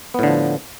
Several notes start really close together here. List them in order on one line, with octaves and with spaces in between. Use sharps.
B3 A2 D3 F3